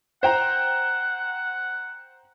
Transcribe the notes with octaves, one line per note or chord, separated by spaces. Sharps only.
C5 F#5 G5 A#5